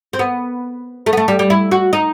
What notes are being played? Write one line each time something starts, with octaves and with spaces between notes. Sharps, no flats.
C4
B3
A3
B3
A3
G3
G3
E4
F#4
D#4